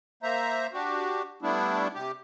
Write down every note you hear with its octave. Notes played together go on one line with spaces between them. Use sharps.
A#3 C5 E5 A#5
D4 F#4 G4
G3 A3 B3 D4 E4
C3 G4